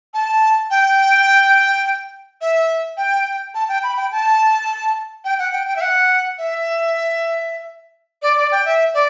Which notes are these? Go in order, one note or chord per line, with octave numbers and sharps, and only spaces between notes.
A5
G5
E5
G5
A5
G5
B5
G5
A5
G5
F#5
G5
G5
E5
F#5
E5
D5
D5
G5
E5
D5